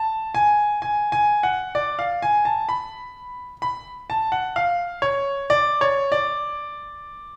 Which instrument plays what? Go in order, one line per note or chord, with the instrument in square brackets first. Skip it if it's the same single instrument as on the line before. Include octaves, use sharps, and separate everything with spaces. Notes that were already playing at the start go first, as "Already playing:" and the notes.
Already playing: [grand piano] A5
G#5
G#5
G#5
F#5
D5
F5
G#5
A5
B5
B5
A5
F#5
F5
C#5
D5
C#5
D5